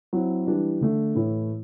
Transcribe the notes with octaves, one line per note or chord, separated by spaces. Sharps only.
F#3 C4 E4
E3 G3 D4
D3 A3 D4
A2 E3 A3 E4